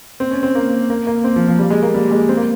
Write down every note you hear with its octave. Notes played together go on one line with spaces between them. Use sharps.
C4
C#4
C4
A#3
A#3
A#3
C4
F3
F3
G3
G#3
A#3
G3
G#3
C4
A#3